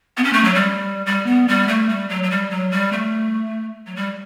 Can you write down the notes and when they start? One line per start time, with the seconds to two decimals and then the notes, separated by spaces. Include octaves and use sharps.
0.17 B3
0.24 C#4
0.33 A3
0.44 F#3
0.54 G3
1.06 G3
1.26 B3
1.48 G3
1.68 A3
1.89 G3
2.09 F#3
2.23 F#3
2.31 G3
2.50 F#3
2.71 G3
2.92 A3
3.86 F#3
3.96 G3